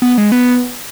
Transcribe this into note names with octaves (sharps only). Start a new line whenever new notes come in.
B3
G#3
B3